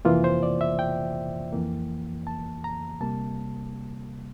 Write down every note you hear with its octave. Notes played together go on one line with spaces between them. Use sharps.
F2 C3 E3 A#3 F4
C5
D5
E5
G5
F2 E3 A#3
A5
A#5
C2 C3 G3 A#3 A5